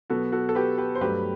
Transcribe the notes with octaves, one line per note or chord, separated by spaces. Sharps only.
B2 F#3 B3 F#4 A4
F#4 A4
A4
G4 B4
G4 B4
C5
G2 F#3 A3 G4 B4